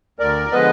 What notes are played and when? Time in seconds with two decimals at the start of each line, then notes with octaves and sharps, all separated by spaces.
0.19 D2 A#4 D5
0.52 D3 F3 G#3 B3 B4 D#5